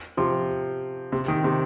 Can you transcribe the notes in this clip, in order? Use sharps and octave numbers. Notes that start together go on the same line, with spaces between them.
C3 F3
C3
D#3
C3